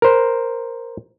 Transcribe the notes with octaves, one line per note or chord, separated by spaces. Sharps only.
A#4 C5